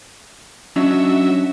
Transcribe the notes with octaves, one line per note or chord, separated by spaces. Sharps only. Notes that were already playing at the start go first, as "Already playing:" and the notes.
F#3 C#4 D4 D#5 E5